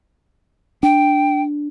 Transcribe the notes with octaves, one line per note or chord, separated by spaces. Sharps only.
D4 G5